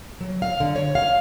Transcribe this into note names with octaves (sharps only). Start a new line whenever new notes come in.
F#3
F5
D3
C#5
F5